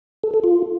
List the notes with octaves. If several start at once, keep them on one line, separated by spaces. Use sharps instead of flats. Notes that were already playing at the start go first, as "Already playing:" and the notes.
A4
A4
F4